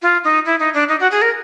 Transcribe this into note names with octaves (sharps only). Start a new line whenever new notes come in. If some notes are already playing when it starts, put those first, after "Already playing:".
F4
D#4
E4
D#4
D4
D#4
F#4
G#4
A#4